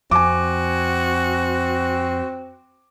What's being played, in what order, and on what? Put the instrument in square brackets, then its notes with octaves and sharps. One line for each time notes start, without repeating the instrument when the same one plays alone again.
[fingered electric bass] F2 [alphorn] C4 [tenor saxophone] F#4 [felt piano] G#5 D6